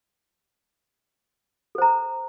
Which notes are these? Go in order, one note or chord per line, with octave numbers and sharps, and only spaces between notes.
A4 C5 A#5